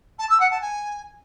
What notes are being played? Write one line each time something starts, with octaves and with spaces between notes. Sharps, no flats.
A5
E6
F#5
A5
G#5